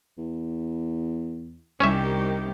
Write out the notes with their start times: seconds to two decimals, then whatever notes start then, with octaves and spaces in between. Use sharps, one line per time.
0.18 E2
1.80 C2 D#3 C#4 G4 C#5 E5